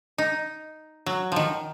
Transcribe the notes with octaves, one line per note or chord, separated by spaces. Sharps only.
D#4
F#3
D#3 F3